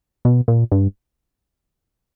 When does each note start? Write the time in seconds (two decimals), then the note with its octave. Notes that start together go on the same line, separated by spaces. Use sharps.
0.25 B2
0.48 A#2
0.72 G2